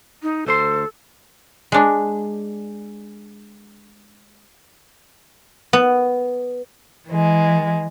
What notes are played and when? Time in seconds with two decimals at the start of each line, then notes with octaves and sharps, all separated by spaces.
0.23 D#4
0.47 D2 A4 C5 C6
1.72 G#3 D4
5.73 B3
7.08 E3 G#3